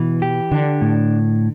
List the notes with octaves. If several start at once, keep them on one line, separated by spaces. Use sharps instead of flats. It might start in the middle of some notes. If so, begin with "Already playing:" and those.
Already playing: B2 E3
G4
D3 D4
A2